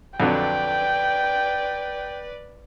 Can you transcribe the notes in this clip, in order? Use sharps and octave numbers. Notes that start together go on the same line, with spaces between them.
F2 D3 F#3 B4 D5 G5